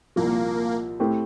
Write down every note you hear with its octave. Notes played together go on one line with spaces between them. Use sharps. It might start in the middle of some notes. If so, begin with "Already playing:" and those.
C2 A#2 F3 A#3
A2 A3 C4 G4